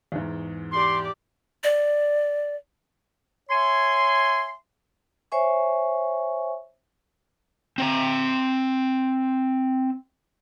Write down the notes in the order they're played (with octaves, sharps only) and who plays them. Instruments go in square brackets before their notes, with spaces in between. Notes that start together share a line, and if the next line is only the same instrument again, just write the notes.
[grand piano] E2 G#2
[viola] G4 D5 [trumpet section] C6
[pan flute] D5
[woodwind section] C#5 E5 G#5 C6
[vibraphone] C5 C#5 E5 G#5 C#6
[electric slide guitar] C4 C5 A#5